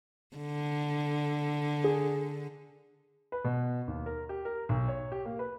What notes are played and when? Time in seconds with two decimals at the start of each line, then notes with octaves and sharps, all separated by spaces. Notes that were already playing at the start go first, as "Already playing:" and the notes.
0.36 D3
1.84 G#4
3.32 B4
3.44 B2
3.88 D#2
4.06 A#4
4.29 G4
4.45 A#4
4.69 B1
4.88 C#5
5.12 G4
5.25 A#3
5.39 B4